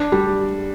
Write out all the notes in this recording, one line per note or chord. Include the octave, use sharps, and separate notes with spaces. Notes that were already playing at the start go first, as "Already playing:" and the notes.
Already playing: D4
G3